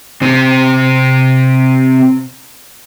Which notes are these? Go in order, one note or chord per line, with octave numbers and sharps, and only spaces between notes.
C3 C4